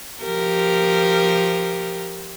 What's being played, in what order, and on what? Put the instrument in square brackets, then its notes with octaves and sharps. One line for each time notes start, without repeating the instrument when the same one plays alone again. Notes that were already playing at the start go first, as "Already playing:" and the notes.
[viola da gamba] F3 G4 A#4